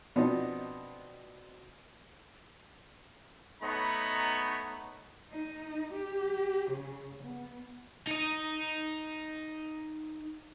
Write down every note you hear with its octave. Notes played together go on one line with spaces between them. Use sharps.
B2 F3 B3 C4 D4 D#4
A3 B3 D#4 C#5 A#5 B5
D#4
G4
C#3
B3
D#4 D#5